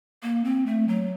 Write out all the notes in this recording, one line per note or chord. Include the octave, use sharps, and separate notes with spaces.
A#3
C4
A3
F#3